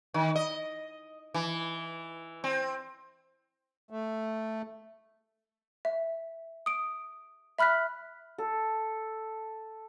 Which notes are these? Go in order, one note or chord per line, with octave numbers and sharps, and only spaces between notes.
D#3
D#5
E3
C4
A3
E5
D#6 D7
E5 B5 F6 F#6 B6
A4